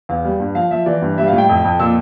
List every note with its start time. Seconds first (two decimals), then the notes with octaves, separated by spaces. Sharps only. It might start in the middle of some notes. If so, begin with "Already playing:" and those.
0.09 E2 F5
0.25 G3
0.40 G2
0.55 F3 F5
0.71 F3 E5
0.86 E3 D5
1.02 G2
1.18 G3 E5
1.27 F5
1.32 A2
1.38 G5
1.49 F2
1.65 F2
1.79 A#2 E6